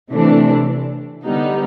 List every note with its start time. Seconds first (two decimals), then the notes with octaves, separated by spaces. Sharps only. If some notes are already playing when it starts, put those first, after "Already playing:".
0.10 C3 E3 A3 D4
1.25 D3 G3 B3 D#4